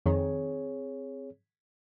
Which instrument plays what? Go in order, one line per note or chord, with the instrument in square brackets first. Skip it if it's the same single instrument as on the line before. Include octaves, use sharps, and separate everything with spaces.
[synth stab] F2 D#3 [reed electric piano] C4 G#4 C#5